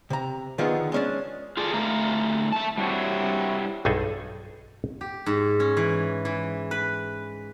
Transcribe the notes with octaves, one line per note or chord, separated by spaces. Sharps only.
C3 A#5
D3 D#3 F3 B3 F4 G#4
G#3 C#4 D4
F4 G#4 A4 D5
D3 A3 E4 F5 A#5
A3 A5
G3 C4 D4 E4 F#4 C#5
B1 G2 D#4 G#4 A4 G#5
G4
G#2
C#4
E3
E3
B4